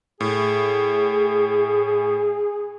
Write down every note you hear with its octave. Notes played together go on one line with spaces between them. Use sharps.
A2 G#4